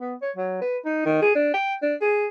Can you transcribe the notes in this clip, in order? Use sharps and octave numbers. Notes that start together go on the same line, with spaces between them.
B3
C#5
F#3
B4
D#4
D#3
G#4
D4
G5
D4
G#4